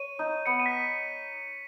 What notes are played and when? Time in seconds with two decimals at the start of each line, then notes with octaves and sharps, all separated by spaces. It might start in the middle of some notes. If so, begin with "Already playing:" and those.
Already playing: C#5 D#7
0.19 D#4
0.46 B3 C#7
0.60 D#7
0.66 B6